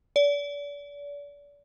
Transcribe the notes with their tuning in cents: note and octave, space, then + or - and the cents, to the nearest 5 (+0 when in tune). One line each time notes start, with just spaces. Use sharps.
D5 -35